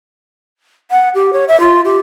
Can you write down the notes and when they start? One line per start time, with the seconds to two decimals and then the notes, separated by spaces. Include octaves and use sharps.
0.91 F#5
1.15 G4
1.33 C#5
1.48 E5
1.60 F4
1.85 G4